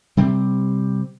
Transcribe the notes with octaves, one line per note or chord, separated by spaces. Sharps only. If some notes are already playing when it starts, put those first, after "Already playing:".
C3 G3 C4